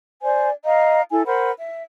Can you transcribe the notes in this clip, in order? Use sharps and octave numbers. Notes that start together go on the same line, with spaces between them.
C5 D5 G#5
D#5 F5 A#5
E4 A4 G#5
A#4 C5 F#5 B5
E5